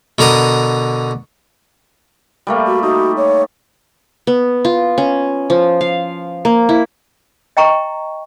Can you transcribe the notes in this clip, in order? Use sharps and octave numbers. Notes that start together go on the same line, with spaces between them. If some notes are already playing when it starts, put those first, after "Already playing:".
B2 D3 A#4 D#6
G3 A3 A#3
F#4
D#4 F#4
C#5
B3
F4
C#4
F3
F5
A#3
E4
D#5 G5 A#5 C#6